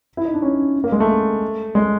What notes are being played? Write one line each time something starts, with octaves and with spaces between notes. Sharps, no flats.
E4
D#4
D4
C#4
A#3
G#3
A3
G#3